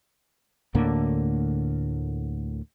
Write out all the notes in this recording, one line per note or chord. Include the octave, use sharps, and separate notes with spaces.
D2 A2 D3 A#3